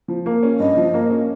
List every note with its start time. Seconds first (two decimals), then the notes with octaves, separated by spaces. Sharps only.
0.08 F3
0.26 A#3
0.43 C#4
0.59 G2 D#5
0.77 F3
0.94 A#3
1.10 C#4